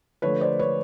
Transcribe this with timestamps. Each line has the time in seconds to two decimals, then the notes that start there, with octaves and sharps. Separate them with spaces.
0.22 D3 F3 A3 B4 C#5
0.41 C5 D5
0.59 B4 C#5